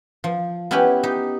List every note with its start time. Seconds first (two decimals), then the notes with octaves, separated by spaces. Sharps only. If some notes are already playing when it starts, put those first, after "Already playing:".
0.24 F3
0.71 B3 C#4 E4 G4 B4
1.03 D#4 G4